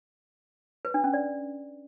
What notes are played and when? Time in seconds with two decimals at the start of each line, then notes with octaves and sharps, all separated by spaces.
0.85 B4
0.94 D4
1.04 C#4
1.13 D5